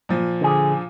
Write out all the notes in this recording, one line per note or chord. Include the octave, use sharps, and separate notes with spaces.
A#2 F3
D3 G#4